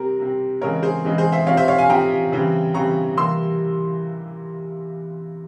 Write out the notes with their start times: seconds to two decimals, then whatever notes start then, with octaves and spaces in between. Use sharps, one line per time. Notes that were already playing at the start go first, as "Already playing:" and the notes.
Already playing: C3 G3 C4 G4 A#4
0.19 C3 G3 C4
0.61 C#3 E3 G#3 C4 A#4 C#5
0.82 G#4 C5
1.04 C#3 E3 G#3 C4
1.18 G#4 C5
1.32 C5 E5
1.47 C3 F3 C4 C#5 F5
1.57 C5 E5
1.68 C#5 F5
1.78 F5 G#5
1.89 C3 F3 C4 G5 A#5
2.32 C#3 E3 G3 C4
2.74 C#3 E3 G3 C4 A#5 C#6
3.17 C3 E3 G3 A#3 C6 E6